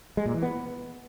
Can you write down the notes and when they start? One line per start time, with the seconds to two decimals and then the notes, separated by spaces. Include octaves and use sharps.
0.17 G#3
0.26 A#2
0.34 E3
0.42 B3